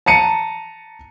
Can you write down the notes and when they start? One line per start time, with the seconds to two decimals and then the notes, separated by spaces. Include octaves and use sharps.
0.06 A5 A#5 C#7 D#7